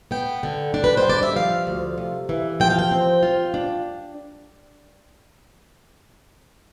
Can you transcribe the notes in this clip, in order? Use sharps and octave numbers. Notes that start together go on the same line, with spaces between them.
B3 G5
D3
D4
B4
C5
G2 D5
E5
F3 F5
D2
C3
E3
F3 G5
F5
G5
C4
F4
D4